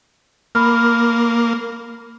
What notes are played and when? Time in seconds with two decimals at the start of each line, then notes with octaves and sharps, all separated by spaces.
0.55 A#3 B5 F6